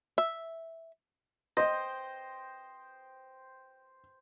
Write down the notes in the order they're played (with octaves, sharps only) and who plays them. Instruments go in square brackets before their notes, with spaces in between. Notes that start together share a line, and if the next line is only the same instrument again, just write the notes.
[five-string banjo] E5
[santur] C5 G5 [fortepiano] D#5